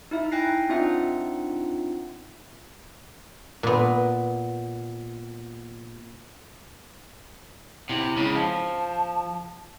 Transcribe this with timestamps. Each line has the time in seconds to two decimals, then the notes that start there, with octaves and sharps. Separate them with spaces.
0.11 D#4 E4 E5
0.32 D#4 G5 G#5 F#6 A#6 C7
0.69 C4 D4 D#4 F4 E5 F#5
3.63 A#2 B3
7.89 C3 E4
8.16 C#2 C#3
8.34 F3 A5